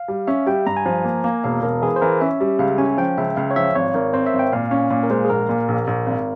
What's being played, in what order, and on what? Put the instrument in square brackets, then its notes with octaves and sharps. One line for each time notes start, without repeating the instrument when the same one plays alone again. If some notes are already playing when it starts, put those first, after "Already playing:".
Already playing: [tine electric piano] F5
[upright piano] G3
[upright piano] C#4 [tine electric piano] E5
[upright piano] G3 [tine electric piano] G5
[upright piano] G2 [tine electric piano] A#5
[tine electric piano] G#5
[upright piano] F3
A#3
A#3
[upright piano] E1 [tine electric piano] F5
[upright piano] E1 [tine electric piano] A#4
[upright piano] E3 [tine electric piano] G#4
[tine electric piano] C5
[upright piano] E3 [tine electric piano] A#4
[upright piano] C#4 [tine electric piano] E5
[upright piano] G3
[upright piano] C#2 [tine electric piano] F5
[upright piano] C#4 [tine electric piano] G#5
[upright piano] F3 [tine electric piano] G5
[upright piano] C#2 [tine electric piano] E5
[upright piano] C#2 [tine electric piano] F5
[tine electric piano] C#5
[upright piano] F3 [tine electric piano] E5
[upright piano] G#1 [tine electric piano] C#5
[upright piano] G#1 [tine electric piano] A#4
[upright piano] C4 [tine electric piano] C5
[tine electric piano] E5
[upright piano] G#1
[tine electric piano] G5
[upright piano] A#2 [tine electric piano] F5
[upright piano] C#4
A#2
[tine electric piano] A#4
[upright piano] G#3 [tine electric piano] C5
[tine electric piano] G#4
[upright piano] A#1 [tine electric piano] A#4
[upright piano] A#2
A#1
A#1
G#1